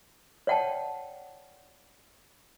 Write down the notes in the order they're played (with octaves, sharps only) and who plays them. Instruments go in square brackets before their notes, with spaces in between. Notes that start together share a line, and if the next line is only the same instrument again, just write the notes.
[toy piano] C#5 D5 F#5 G5 A5